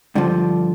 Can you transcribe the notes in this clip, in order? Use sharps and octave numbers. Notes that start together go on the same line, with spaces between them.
G2 D3 F3